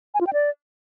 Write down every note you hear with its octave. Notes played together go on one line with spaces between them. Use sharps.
G#5
F4
G5
D5